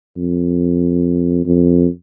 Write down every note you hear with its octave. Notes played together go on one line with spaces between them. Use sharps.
F2
F2